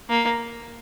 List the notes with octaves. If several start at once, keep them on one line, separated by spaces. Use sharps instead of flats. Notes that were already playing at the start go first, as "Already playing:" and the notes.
A#3